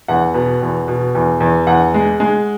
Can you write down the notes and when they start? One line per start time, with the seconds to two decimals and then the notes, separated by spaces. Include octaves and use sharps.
0.08 E2 F#5
0.34 B2
0.62 E2
0.88 B2
1.15 E2
1.40 E2
1.67 E2 F#5
1.94 G#3
2.20 G#3